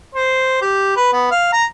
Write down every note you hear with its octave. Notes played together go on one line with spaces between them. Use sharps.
C5
G4
B4
B3
F5
A#5